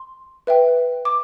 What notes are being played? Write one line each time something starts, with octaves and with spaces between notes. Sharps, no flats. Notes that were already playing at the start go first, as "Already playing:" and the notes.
Already playing: C6
B4 E5 G5
D6